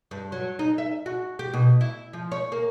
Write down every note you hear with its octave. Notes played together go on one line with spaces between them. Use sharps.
G2
F#3
D#4
E5
F#4
G4
B2
E4
F3
C#5
A#3